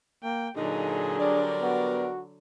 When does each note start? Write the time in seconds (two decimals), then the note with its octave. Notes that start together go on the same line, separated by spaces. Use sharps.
0.24 A#3 G5
0.56 A#2 D3 F#3 D#4 G#4
1.19 G3 D4 A#4 D5
1.61 B3 F#4